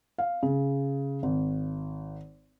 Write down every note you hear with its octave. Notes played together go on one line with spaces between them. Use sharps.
F5
C#3
G#1